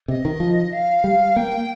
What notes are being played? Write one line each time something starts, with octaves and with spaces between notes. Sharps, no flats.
C3 D#5
D#3
F3
F5
G3
A#3 G5